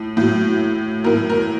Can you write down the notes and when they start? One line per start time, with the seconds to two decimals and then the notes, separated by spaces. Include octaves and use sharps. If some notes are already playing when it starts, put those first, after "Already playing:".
Already playing: A2
0.17 A2 F#3
1.04 A2 F#3 A#4
1.30 A#4